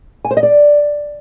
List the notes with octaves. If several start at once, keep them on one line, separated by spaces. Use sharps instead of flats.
G#5
C5
D#5
D5